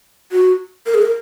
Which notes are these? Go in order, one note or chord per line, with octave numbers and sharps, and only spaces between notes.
F#4
A#4
G#4
A#4